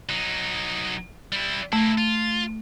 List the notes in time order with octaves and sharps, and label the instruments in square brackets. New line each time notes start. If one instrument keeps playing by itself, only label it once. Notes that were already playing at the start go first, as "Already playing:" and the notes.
[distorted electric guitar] F#3 D#4
G3 E4
[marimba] A3 [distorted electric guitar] A#3 E4
[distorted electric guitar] F4